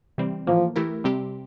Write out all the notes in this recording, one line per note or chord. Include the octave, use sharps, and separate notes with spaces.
C3 E3 G3 C4
A2 E3 F3 A#3
E3 A3 E4 G4 A#4
C3 G3 C4 G4